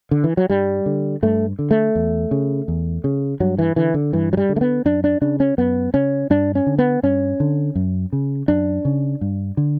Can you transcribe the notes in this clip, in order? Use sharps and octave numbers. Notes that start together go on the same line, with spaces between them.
D3
E3
F#3
G2 G3
D3
G2 A3
D3
A3
E2
C#3
E2
C#3
G2 F#3
E3
D3 E3
D3
G2 E3
F#3
G3
D3
A3
B3
F#2 D4
D4
C#3 D4
C#4
F#2 B3
C#3 C#4
G2 D4
C#4
D3
B3
G2 C#4
D3
F#2
C#3
F#2 D4
C#3
G2
D3